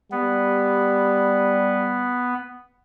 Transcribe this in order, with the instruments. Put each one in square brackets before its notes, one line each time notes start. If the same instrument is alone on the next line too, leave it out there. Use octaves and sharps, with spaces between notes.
[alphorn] G3 [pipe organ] B3